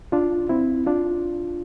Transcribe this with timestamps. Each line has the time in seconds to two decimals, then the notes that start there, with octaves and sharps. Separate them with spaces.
0.12 D4 F4
0.49 C4 E4
0.86 D4 F4